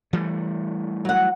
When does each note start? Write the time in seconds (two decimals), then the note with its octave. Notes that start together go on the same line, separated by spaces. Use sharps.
0.13 E3 G3 A3
1.05 F#3 F#5